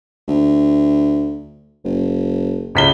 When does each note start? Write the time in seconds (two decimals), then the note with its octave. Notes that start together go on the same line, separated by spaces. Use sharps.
0.28 D2
1.85 F#1
2.75 C#2 B6 G7